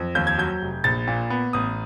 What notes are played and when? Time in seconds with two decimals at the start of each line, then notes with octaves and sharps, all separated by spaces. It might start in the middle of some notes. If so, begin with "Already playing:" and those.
Already playing: F2
0.15 D#2 G6
0.27 G#6
0.38 F#3 G6
0.62 F1
0.84 A#1 A6
1.07 A#2
1.30 B3
1.53 A1 D#6